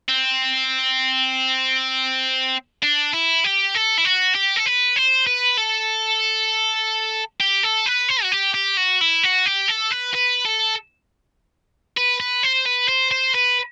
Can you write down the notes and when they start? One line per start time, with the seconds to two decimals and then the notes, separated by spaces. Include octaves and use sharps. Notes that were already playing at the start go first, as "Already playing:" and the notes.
0.09 C4
2.83 D4
3.13 E4
3.44 G4
3.75 A4
3.98 E4
4.05 F#4
4.35 G4
4.57 A4
4.66 B4
4.96 C5
5.27 B4
5.58 A4
7.40 G4
7.63 A4
7.86 B4
8.09 C5
8.23 F#4
8.32 G4
8.54 G4
8.77 F#4
9.01 E4
9.23 F#4
9.46 G4
9.69 A4
9.92 B4
10.15 B4
10.45 A4
11.97 B4
12.20 B4
12.43 C5
12.66 B4
12.88 C5
13.11 C5
13.34 B4